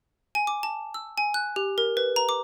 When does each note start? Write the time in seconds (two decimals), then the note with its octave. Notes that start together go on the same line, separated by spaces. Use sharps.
0.35 G#5
0.47 D6
0.63 A5
0.94 E6
1.18 G#5
1.34 F#6
1.56 G4
1.78 A#4
1.97 B4
2.16 A#5
2.29 D6